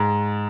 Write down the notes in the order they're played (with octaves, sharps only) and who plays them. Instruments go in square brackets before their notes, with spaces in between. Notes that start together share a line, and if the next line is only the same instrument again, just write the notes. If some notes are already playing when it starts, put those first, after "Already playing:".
Already playing: [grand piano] G#2